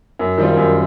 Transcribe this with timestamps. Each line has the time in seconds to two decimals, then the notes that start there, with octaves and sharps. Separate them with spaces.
0.19 F#2
0.38 D#3 G3 C4 F4
0.57 F#2